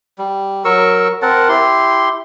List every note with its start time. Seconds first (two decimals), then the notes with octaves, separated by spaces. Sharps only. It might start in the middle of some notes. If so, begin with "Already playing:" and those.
0.18 G3
0.65 F#3 A#4 C#6 E6
1.22 C4 A#4 F#5 A5
1.49 E4 G4 C6